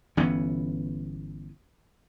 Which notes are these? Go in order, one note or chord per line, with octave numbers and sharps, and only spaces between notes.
G1 E3 B3 C#4